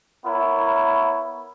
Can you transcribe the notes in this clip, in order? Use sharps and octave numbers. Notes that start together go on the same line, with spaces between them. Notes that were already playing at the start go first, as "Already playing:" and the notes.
B3 E4 A#4 C#5